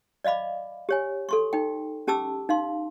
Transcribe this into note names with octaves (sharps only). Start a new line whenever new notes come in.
D5 D#5 F5 B5 D6
G4 C#5 G#5
A4 C6 C#6
D#4 G5
C#4 G4 A5 D6 E6
D#4 F5 C6